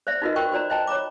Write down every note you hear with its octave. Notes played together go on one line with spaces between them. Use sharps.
C5 D5 E5
D#4 F4 F#4 A#4 B4 D#5
F#4 A#4 C5 G5 C#6
F#4 C5 D5 A#5
C5 D#5 G5 A5 A#5
C#5 A#5 B5 D6